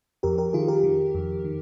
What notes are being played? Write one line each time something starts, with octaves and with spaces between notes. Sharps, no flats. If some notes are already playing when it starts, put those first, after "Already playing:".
F2 G4 A#4
G4 A#4
D#3 F4 G#4
G4 A#4
D#3
F2
D#3